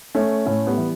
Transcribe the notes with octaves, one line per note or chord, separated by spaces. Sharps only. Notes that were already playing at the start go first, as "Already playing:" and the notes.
A3 C#4
A2 A3 C#4
G3 B3
E3